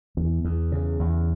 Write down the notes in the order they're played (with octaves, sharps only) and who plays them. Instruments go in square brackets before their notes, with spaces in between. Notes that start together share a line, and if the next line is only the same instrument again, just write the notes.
[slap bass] E2
E2
C#3
E2